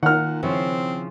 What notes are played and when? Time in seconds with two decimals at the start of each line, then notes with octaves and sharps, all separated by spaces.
0.03 A#2 D#3 A#4 F#5 F6
0.43 C#3 F3 C4 E4